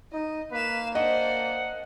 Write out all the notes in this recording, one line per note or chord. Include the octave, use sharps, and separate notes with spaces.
D#4 D#5
A#3 B4 F5 E7
D4 C5 D#5 F#5